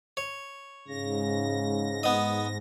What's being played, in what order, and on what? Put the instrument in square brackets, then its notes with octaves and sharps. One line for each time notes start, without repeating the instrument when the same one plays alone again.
[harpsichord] C#5
[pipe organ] G#2 A#6 [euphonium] C#3
[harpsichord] B3 D#5